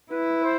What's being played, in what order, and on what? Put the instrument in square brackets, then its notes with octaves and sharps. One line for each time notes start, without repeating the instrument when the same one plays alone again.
[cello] E4 [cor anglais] B4
[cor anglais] C5